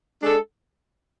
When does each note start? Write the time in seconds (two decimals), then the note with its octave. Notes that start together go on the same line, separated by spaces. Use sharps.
0.22 G#3 D4 A4